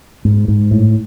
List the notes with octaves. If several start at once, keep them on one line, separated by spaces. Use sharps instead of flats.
G#2
G#2
A2